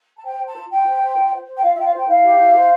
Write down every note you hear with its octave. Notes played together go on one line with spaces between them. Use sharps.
A5
C5 G5
C5
A5
F4
F4 G5
C5
C5
F4
C5
C5
G5
F4 F5
E5
F4 G5
F5
C5 G5
E4 F5
G4
E4
C5